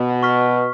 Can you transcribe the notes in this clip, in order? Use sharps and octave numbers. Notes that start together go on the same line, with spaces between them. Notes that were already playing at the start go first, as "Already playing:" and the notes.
Already playing: B2
C#6 F6 B6